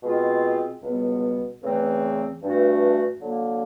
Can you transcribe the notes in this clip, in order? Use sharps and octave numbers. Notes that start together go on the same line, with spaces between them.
B2 G#3 C4 F4
C#2 B2 G3 B3
E2 C#3 E3 A3 C4
G2 E3 A3 D4 F#4
D3 F#3 A#3